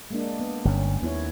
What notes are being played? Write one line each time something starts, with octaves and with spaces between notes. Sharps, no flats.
G#3 A#3 D4
B3
G1 G2 C#4
D#2 B3 E4 C#5